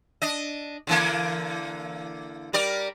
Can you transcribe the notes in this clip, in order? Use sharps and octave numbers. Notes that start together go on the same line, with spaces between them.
D4 D#5
D3 E3 A#3
G3 A#4 D5